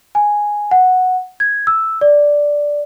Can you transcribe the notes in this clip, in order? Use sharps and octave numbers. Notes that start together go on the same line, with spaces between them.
G#5
F#5
G#6
E6
D5